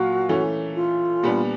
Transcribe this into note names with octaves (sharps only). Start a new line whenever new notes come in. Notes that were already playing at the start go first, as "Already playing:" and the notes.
Already playing: A#2 F#3 F4 F#4
E3 A3 C#4
F4
A#2 G3 B3 D4